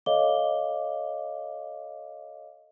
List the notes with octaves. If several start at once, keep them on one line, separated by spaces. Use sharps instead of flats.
A4 C#5 D#5 F5 D6 G7